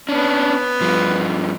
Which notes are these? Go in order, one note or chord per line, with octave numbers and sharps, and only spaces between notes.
B3 C#4 D4
G2 F3